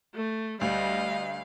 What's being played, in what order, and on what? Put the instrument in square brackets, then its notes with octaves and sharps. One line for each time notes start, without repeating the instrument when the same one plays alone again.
[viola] A3
[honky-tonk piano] D2 [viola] G3 D#5 [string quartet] F5